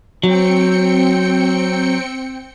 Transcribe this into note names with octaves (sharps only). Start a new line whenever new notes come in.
F#3 C4 G5 C#7